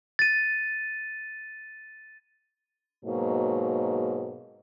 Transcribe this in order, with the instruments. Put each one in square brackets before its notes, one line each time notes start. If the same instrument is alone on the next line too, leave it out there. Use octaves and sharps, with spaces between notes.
[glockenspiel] A6 D#7
[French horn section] G#2 B2 F#3 A#3